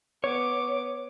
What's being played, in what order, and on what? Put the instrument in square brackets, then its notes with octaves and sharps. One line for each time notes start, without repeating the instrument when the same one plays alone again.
[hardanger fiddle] B3 D6 [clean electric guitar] C#5